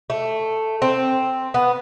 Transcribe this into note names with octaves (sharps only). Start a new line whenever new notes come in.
A3
C4
B3